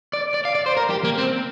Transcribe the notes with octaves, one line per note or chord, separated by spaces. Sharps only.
D5
D5
F5
D5
C5
A#4
G4
A#3
C4